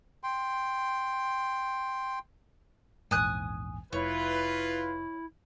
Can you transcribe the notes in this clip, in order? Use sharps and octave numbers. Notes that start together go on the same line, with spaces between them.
G5 C6
A#1 E2 G#2 G#5 D#6 F#6
F1 E4 F4 B4 C#5